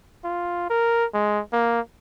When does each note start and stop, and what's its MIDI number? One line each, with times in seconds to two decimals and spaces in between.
0.24 0.65 65
0.70 1.05 70
1.14 1.41 56
1.53 1.81 58